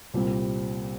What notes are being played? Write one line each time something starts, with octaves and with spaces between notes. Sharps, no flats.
C2 A#2 G3 C4